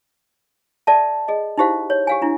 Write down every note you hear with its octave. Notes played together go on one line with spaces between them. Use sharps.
A4 D5 E5 A5
G#4 D#5
D#4 E4 G4 C5 F5
C#5
G4 F5 G#5
D4 E4